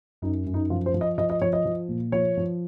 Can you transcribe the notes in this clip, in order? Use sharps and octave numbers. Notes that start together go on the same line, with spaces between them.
F#2 D#4
F#2
D#4
F3 F4
C5
F3
D#5
F3 D#5
D#5
F3 C#5
D#5
F3
A#2
F3 C#5
F3